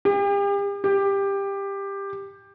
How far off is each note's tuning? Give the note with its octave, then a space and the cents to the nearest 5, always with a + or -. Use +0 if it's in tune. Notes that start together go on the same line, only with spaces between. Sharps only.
G4 +40
G4 +15